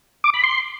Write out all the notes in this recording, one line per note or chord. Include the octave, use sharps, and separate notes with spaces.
D6
B5
C6